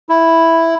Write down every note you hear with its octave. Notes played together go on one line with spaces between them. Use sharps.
E4